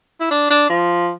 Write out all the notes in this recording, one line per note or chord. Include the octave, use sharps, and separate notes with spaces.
E4
D4
D4
F3